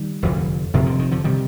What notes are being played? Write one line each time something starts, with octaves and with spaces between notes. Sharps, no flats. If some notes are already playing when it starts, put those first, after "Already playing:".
Already playing: D#3 G3
F1 F2 D3
F1 F2 C3 D#3
D3
D#3
D3 F3
C3 D#3 G3